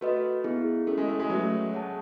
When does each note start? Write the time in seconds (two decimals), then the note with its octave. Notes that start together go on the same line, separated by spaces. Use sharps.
0.01 A3 F#4 B4 D#5
0.44 B3 E4 G#4
0.87 A3 C#4 E4 A4
0.98 G#3
1.08 A3
1.20 G#3
1.30 F#3 A3 C#4 G#4 B4 E5
1.73 G#4 C#5 F#5 A5